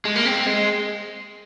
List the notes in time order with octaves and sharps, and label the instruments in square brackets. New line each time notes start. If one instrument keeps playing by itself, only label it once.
[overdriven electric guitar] G#3
A#3
C4
G#3